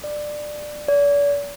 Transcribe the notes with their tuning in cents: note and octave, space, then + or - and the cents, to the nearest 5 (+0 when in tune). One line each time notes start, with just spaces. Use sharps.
D5 +15
D5 -40